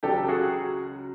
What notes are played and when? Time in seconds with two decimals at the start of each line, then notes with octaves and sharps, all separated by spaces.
0.03 C#2 C#3 F#3 G4 A4
0.28 F#4 G#4